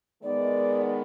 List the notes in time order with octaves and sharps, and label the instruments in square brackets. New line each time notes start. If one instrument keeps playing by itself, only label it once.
[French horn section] D#3 G#3 B3 [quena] D5